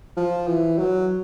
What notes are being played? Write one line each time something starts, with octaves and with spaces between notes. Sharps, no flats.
F3
E3
F#3